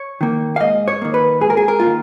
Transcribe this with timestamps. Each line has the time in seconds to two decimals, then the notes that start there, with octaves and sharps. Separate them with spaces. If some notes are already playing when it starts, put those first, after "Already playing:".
Already playing: C#5
0.21 D#3 A#3
0.56 F5
0.60 G#2 D#5
0.88 C#5
1.02 D#3 A#3
1.14 B4
1.41 G#2 G#4
1.50 A#4
1.57 G#4
1.68 A#4
1.80 A#3 F4
1.86 D#3